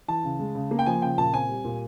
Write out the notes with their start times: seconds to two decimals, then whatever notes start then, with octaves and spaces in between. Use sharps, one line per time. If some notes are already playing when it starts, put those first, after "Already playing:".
0.08 E3 A5
0.23 C#3
0.39 G#3
0.55 C#3
0.71 A#3
0.79 G5
0.86 F3 G#5
1.02 C#3 G5
1.18 A#2 A5
1.33 C4 G#5
1.49 G3
1.65 A#2